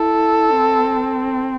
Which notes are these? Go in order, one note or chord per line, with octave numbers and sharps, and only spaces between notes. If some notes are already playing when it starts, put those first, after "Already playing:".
Already playing: E4 A4
C4